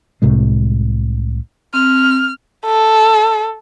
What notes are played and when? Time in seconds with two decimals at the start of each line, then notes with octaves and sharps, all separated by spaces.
0.22 C2 A2 C3 G#3
1.74 C4 F6
2.66 A4